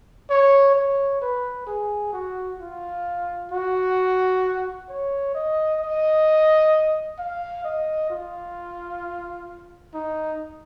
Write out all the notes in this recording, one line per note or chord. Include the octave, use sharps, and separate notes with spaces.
C#5
C#5
B4
G#4
F#4
F4
F#4
C#5
D#5
D#5
F5
D#5
F4
D#4